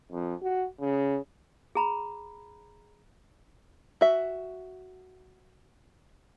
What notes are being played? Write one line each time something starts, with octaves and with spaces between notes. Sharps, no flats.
F2
F#4
C#3
G#4 A#5 B5
F#4 E5